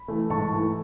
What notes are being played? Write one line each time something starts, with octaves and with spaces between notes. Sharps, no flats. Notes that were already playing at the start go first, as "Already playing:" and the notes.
Already playing: B5
E3 A3
G#2 A5 C#6
E3 A3